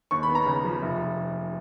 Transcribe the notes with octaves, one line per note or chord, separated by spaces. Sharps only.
D#2 C#6
B5
B3
A#5
C#3
F3
F1